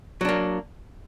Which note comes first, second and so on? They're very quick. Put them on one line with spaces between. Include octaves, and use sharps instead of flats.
F#3 D4 A#3